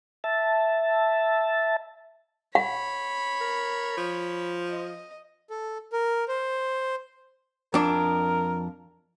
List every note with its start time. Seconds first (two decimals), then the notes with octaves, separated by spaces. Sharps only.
0.24 E5 A5
2.55 C#5 F#5 B5
3.41 A#4
3.97 F3
4.69 D#5
5.50 A4
5.93 A#4
6.28 C5
7.74 F2 D4 A#4